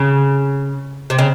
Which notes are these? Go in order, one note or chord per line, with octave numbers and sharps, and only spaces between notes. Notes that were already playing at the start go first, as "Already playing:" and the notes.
Already playing: C#3
C3
C#3